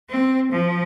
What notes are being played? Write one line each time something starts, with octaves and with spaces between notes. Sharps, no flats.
C4
F3